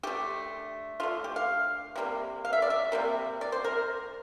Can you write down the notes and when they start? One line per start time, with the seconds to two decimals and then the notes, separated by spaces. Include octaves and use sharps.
0.03 D3 A3 G4
1.00 D3 A3 F4
1.24 G4
1.36 F5
1.96 C3 G3 A#3
2.45 F5
2.53 E5
2.62 D5
2.70 E5
2.92 C3 G3 A#3
3.41 D5
3.52 C5
3.64 A#4